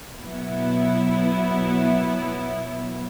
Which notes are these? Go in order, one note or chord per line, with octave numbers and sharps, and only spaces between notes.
B2 F#3 B3 E4